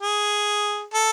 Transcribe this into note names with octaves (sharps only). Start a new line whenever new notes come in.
G#4
A4